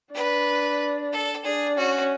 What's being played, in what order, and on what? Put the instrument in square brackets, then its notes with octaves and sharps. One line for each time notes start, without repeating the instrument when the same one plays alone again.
[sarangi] D4 [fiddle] B4
[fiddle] A4
[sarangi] D4 [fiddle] G#4
[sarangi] C#4 [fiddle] F#4